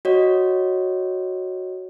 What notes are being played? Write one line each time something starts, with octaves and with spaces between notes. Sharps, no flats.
F#4 C#5 D#5